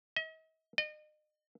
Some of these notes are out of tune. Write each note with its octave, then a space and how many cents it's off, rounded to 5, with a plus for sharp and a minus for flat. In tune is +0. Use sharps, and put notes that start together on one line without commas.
D#5 +45
D#5 -35